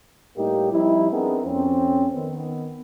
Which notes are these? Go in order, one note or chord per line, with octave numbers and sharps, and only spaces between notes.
A2 G3 A#3 D#4 G4
F3 G3 C4 D#4 E4
B3 C4 D4 D#4 G#4 A#4
F2 C4 C#4
D#3 B3